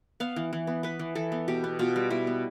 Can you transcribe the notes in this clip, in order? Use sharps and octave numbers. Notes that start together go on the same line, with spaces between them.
B3 F5
E3
E3
B3
B3 B4
E3
E3 A4
B3
B2 G4
B3
B2 F4
G3
B2 E4
B3